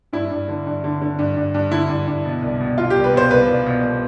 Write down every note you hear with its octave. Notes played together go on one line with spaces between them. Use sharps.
G2 E4
G2
D3
G2
D3
D3
G2
G2
G2
D3 E4
G2
G2
B2
C2
B2
B2 F4
G4
C2
B4
B2 C5
C2 B4
C2
B2
B2